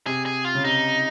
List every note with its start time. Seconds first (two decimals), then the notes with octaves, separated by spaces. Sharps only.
0.06 C3 G#4
0.26 G#4
0.45 F4
0.55 C#3
0.64 C3 D#4